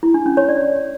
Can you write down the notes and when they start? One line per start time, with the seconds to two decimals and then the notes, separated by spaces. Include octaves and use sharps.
0.03 E4
0.14 D4
0.26 C#4
0.37 C#5
0.49 D5